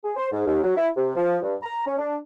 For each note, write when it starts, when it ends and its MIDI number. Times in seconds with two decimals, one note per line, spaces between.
0.05 0.12 68
0.17 0.28 72
0.31 0.44 44
0.47 0.60 39
0.64 0.74 54
0.76 0.89 64
0.97 1.10 48
1.15 1.38 53
1.42 1.55 43
1.63 1.85 82
1.87 1.95 61
1.98 2.16 62